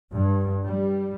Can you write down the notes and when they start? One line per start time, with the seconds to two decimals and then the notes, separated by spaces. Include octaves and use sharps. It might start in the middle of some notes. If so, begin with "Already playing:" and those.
0.13 G2
0.65 G3